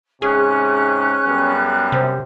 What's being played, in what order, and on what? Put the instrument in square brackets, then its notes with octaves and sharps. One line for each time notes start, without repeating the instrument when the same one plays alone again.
[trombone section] G#2 C3 [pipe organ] C#4 [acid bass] G#4 [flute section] F#6
[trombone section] F#2 G3 B3
[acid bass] C3 [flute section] C5